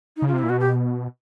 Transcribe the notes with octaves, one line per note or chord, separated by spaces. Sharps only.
D#4
C#3
F4
C3
E4
A#2
B2 F#4
G4